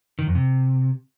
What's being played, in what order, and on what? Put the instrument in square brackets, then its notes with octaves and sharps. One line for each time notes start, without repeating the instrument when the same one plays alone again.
[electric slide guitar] D#3
F2
C3